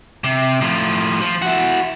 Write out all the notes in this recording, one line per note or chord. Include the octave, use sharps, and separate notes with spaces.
C3
A2 F3
F3
E4 F#4